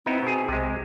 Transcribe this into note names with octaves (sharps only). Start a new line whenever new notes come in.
B3 C4 D#4 E4
B2 G#4
B1 C3 G#3